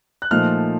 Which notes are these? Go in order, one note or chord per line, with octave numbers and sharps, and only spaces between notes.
F#6
A#2 F3 A3 D#4 F6